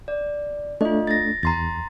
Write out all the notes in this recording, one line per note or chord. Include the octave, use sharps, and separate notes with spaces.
D5
A3 D4 F4 D#5
A6 A#6
E2 A#5 C6 A6